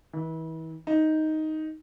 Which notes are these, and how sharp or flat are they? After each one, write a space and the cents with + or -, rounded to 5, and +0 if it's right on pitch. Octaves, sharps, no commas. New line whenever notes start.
E3 -35
D#4 +5